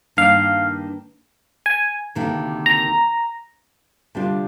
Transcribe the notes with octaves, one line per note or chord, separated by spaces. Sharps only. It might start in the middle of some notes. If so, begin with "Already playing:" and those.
G2 D#3 A#3 D4 F5
G#5
D2 C3 D#3 A#3
A#5
D2 C3 G3 D4 F4